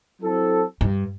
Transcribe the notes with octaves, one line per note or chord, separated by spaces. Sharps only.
F#3 C4 E4 A4
G2